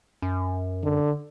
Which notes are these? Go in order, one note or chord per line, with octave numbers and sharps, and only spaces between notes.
F#2
D3